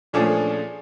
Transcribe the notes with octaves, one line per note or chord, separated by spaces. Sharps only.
A#2 F3 A3 C#4 D4 G#4